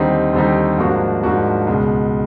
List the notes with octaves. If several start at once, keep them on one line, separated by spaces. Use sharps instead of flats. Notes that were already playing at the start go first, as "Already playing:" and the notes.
Already playing: D#2 D3 G3 C4 D#4
D#2 D3 G3 C4 D#4
G#2 F3 A#3 D4 F#4
G#2 F3 A#3 D4 F#4
C#2 B2 G#3